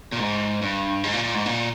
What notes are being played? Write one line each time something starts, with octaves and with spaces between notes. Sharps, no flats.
A#2
G#2
G2
G#2
A#2
A#2
G#2
A#2